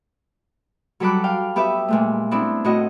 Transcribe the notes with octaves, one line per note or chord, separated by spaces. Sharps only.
F#3 G3 A4 B5 D6 F#6
F5 G5
B3 G4 B4 E5
A#2 G#3 A3
B3 C4 D4 E4
A2 F#4 D#5